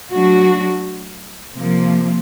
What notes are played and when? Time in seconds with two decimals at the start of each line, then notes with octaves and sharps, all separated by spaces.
0.11 F#3 A3 D4 F#4
1.56 C3 F3 A#3